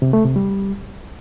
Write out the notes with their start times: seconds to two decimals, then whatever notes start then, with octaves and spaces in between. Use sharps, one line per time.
0.02 C3
0.13 A3
0.25 C3
0.36 G3